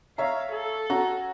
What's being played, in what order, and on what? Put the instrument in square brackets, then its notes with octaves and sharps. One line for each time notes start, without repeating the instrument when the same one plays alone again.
[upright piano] C#5 E5 A#5 [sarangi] F5
[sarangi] A4
[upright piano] C#4 F#4 A#5